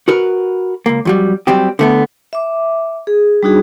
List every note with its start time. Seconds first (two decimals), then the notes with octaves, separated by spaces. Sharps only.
0.08 F#4 A#4 B4
0.86 C#2 A#3
1.05 F2 F#3 G3
1.47 F#3 G3 C4 G4
1.79 D3 A3 B3
2.33 E5 D6
3.07 G#4
3.43 G3 D4 D#4 F#4 G#4